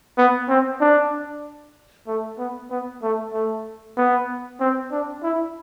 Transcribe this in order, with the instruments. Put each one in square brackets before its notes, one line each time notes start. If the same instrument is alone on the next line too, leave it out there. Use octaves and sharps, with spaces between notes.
[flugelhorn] B3
C4
D4
A3
B3
B3
A3
A3
B3
C4
D4
E4